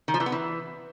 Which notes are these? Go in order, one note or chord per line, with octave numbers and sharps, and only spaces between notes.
D#3
F3
E3
B3
E3